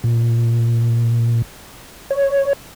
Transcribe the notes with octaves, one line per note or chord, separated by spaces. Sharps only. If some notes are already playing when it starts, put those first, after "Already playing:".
A#2
C#5